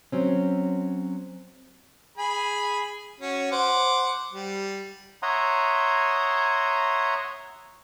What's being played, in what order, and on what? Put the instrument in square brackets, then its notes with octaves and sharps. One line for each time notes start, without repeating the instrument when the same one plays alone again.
[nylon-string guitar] F#3 C4 C#4
[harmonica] G#4 G#5 B5
C#4 F#4
C5 F#5 D6
G3
[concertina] C#5 E5 F#5 A#5 C6 D#6